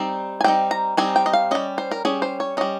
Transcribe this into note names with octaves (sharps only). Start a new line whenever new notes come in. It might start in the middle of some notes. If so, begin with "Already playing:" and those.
Already playing: G3 C4 D#4
G#5
G3 C4 D#4 G5
A#5
G3 C4 D#4 G#5
G5
D#5
F5
G3 C#4 D#5
C5
A#4
G3 C#4 G#4
C5
C#5
G3 C#4 D#5